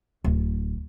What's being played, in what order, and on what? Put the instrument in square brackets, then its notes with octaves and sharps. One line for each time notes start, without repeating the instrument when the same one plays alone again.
[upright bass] D1